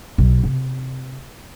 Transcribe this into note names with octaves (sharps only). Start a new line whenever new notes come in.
B1
C3